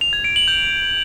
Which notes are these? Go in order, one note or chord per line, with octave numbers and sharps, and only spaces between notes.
F7
G#6
D7
F#7
G6